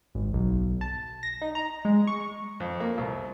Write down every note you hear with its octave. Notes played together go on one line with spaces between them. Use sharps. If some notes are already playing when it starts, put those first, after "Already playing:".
G#1
B1
A5
A#6
D#4
A#5
G#3
C#6
F2
A#3
C2